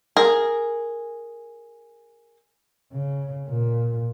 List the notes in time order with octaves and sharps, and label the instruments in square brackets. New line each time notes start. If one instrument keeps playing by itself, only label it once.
[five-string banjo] G#4 A#4
[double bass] C#3
A#2